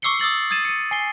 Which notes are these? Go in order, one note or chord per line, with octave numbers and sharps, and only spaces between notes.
C#6 D6 E6 C7 C#7 G7
D#6 E6 A6 F#7
D#6 G#6 A6 D#7 E7
C#7 D#7
G#5 C7 G7